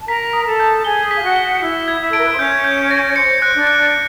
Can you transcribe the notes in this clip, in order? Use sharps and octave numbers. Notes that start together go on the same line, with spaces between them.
A5
A#4 A#5 B6
D#6
A4 A5
G6
G#4 G#5 G7
B6
F5
F#4 F#5
G7
E4 E5 B6
G#6
E4 E5
A4
A#4 D7
B4
C5
C#4 C#5 G6
G6
A#6
C5 C#7
F#6
D4 D5
F#6